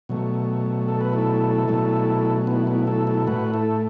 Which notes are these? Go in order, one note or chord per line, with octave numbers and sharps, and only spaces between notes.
B2 F#3 A3
A4
B4
E4 A4
B2 F#3 A3
B3 E4
B3 E4
E4 A4
E4 A4
A2 A3 F#4 B4
E4 A4